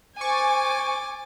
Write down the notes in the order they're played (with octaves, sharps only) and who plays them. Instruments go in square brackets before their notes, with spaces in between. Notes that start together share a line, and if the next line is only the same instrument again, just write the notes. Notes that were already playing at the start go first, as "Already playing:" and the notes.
[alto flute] C5 [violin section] G#5 [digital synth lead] C#6 [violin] D6 A6